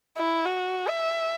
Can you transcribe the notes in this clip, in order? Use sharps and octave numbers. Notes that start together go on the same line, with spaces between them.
E4
F#4
E5